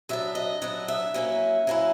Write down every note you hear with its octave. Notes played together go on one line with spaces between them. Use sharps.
F#3 B3 D4 E5
D#5
F#3 B3 D4 D#5
E5
F#3 A#3 C#4 E4
F#3 A#3 C#4 E4